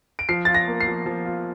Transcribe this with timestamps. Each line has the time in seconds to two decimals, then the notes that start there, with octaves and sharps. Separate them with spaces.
0.19 D7
0.29 F3 C7
0.45 F4 A6
0.55 A#6
0.67 A#3
0.80 C7
0.87 F3
1.06 F3
1.25 F4